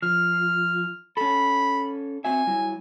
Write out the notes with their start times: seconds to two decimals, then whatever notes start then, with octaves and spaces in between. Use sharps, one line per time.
0.02 F3 F6
1.17 C#4 A4 B5
2.24 C4 F#4 E5 G#5
2.47 F#3 G3 E4